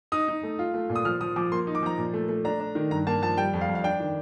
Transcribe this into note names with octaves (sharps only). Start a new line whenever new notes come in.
D#4 D#6
D#4
A3
F4
A3
A#2
D#6
F3 F6
F3 D#6
F3 D6
A#3 C6
D#4
D6
F3 A#5
A#2
A3
A3
D4 A#5
D4
D#3
G2 A#5
A#3 A5
F3 A5
G3 G5
F2
F5
F2
F5
D4 G5
D#3